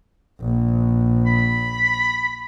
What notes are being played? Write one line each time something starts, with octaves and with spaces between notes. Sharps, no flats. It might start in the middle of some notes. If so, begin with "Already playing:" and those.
A#1
B5